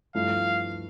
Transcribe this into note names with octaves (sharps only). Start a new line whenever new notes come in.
G2 F3 A3 E4 F5